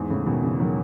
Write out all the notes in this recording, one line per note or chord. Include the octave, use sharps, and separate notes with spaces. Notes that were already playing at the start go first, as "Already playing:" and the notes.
Already playing: E2 G#2
A2 C#3
B2 D#3
C#3 E3
D#3 F#3